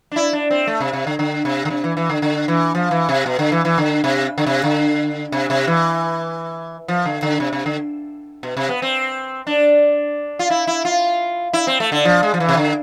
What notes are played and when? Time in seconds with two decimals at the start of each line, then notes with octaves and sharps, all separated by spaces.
0.12 D4
0.16 E4
0.33 D4
0.50 C4
0.67 A3
0.80 C3
0.93 C3
1.07 D3
1.19 D3
1.45 C3
1.65 D3
1.70 C3
1.84 E3
1.97 E3
2.09 D3
2.22 D3
2.48 E3
2.75 F3
2.91 E3
3.09 C3
3.26 B2
3.39 D3
3.52 E3
3.65 E3
3.78 D3
4.04 C3
4.38 D3
4.46 C3
4.64 D3
5.32 C3
5.50 C3
5.67 E3
6.88 F3
7.05 D3
7.22 D3
7.40 C3
7.53 C3
7.66 D3
8.43 B2
8.57 C3
8.69 B3
8.82 C4
9.47 D4
10.39 F4
10.50 E4
10.67 E4
10.85 F4
11.53 E4
11.67 C4
11.80 A3
11.92 D3
12.05 F3
12.23 G#3
12.34 F3
12.40 E3
12.49 C3
12.57 D3